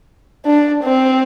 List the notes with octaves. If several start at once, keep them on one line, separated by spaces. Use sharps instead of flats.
D4
C4